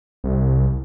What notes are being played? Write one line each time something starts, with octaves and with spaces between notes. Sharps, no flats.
C2